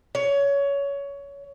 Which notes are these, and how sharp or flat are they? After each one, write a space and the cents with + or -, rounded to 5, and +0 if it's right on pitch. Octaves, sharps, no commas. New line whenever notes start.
C#5 +20